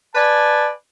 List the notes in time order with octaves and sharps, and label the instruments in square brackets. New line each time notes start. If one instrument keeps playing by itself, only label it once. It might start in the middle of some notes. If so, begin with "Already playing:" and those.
[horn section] B4 D5 G#5 A5